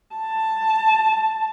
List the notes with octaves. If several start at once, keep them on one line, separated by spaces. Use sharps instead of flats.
A5